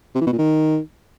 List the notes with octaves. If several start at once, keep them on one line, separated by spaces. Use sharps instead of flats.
C3
E3
B2
A#2
D#3